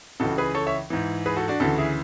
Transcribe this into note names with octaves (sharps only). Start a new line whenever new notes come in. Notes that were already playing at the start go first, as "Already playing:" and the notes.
C#2 C#3 E3 F#4 A4
G#4 B4
A4 C#5
C#5 E5
G#2 E3
G#4 B4
F#4 A4
D4 F#4
D2 C#3 E3 F#4 A4
E4 G#4